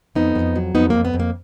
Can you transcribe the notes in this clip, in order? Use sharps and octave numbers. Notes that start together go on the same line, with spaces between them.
F2 B3 D#4
F2
F#3
F2 B3 D#4
F2 A#3
B3
F2
A#3